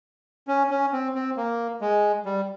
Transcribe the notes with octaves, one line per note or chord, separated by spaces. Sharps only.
C#4
C#4
C4
C4
A#3
G#3
G3